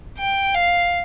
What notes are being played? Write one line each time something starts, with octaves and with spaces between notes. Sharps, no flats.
G5
F5